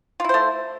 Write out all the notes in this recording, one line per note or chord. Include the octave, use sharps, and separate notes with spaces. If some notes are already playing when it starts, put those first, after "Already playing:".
A3 E4 F4 C5